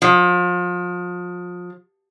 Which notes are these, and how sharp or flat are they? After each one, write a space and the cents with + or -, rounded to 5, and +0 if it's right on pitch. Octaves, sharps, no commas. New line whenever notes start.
F3 +30